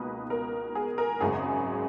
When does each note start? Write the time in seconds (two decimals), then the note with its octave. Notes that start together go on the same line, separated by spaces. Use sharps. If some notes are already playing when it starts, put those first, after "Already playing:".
Already playing: C#2 B2 A#3 D#4 B4
0.30 A#4
0.75 G#4
0.98 A#4
1.20 G#1 F#2 C#3 G#3 G#4